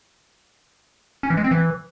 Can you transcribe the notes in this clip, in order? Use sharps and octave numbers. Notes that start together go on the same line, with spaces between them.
C#4
E3
G#3
C4
E3